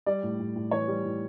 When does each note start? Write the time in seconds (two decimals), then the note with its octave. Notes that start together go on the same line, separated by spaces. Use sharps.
0.06 G3 D5
0.23 A2
0.39 A2
0.56 A2
0.71 E3 C#5
0.88 G3
1.05 A2